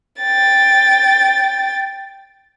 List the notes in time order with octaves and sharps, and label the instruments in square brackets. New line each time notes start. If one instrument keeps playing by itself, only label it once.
[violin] G5 A6